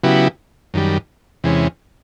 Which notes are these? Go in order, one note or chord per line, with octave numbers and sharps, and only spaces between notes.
C#3 F#3 B3 E4 G4
F#2 D#3 G3
E2 C3 E3 G#3 C#4